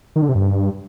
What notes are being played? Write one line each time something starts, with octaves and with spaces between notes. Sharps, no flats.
D#3
D3
C3
G2